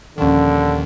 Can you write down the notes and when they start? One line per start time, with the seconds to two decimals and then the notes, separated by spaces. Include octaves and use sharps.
0.18 D#2 A#2 D3 D#3 F3 C#4